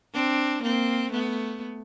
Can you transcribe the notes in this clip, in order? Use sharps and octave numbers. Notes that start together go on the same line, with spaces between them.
C4 D4
A#3 C4
A3 B3